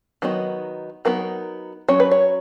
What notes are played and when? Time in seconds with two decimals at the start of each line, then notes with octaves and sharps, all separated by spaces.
0.22 D#3 F#3 B3 D#4
1.05 F#3 B3 D#4 A#4
1.89 F#3 C#4 C#5
2.00 B4
2.11 C#5